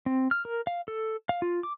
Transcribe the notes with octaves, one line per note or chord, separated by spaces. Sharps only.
C4
F6
A#4
F5
A4
F5
F4
D6